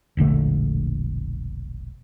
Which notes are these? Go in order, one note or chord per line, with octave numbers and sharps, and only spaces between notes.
E1 A#1 D3 A3